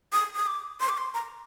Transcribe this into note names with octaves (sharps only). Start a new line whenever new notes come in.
D#6
D#6
D6
C6
D6
C6
A#5